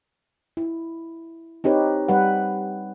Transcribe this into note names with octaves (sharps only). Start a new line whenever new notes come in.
E4
C4 D#4 G4 B4 C#5
G3 B4 F#5